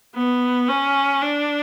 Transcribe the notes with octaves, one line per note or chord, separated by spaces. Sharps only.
B3
C#4
D4